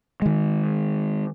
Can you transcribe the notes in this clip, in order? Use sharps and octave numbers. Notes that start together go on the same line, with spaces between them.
D#3 G#3